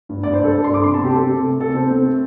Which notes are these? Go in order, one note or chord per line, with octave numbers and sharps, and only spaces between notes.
G2
G2 D5
C5
G2 A4
D4 A4
C6
G2
D6
C3 C6
A5
C4
G4
C4 A4
C3
A3
C3 A4
C4 C5
C4
A3